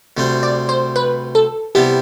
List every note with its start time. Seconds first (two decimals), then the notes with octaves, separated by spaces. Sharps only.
0.17 D2 C3 G3 C4
0.43 D5
0.69 C5
0.96 B4
1.35 A4
1.75 C3 G3 B3 E4 G4